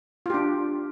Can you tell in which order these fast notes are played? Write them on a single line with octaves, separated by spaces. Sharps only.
F4 G4 D4